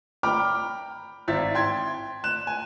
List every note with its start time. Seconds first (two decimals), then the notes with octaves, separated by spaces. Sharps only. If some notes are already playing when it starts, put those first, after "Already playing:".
0.23 G5 A#5 B5 D6 F6
1.28 G#1 E4 A6 B6
1.55 G5 C6 G#6
2.24 F#6 E7
2.47 G#5